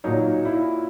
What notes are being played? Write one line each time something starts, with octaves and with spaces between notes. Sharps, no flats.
A#2 F#3 D#4
E4